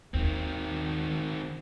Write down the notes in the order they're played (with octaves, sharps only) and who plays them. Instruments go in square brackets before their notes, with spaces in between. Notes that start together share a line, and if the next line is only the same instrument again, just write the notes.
[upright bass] D#2 [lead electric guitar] D#3 C4